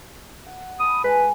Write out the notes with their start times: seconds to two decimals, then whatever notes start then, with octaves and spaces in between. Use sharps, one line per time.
0.46 F#5
0.80 A5 B5 D#6
1.04 G#3 B4